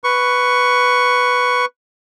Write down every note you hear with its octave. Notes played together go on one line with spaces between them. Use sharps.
B4 C#6